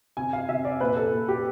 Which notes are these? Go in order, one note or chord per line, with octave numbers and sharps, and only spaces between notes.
C3 G#5
F5
C3 E5
D5
A#2 B4
A4
A#2
G4